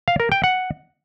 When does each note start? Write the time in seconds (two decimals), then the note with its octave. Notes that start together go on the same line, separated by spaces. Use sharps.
0.08 F5
0.20 A#4
0.32 G5
0.44 F#5